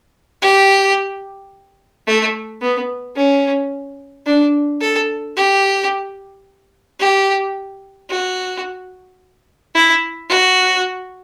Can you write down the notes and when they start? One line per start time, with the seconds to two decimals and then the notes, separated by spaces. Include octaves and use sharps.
0.42 G4
2.07 A3
2.62 B3
3.16 C#4
4.26 D4
4.81 A4
5.36 G4
7.00 G4
8.10 F#4
9.75 E4
10.29 F#4